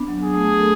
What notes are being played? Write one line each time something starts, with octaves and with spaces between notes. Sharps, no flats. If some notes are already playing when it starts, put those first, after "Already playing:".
Already playing: B3 D4
F#3
G#4
A3
A4